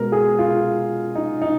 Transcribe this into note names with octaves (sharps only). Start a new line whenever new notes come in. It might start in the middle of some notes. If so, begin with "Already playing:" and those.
Already playing: B2 G#3 B3 A#4
G#4
F4
D#4
D#4